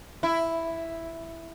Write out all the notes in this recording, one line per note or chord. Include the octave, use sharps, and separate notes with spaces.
E4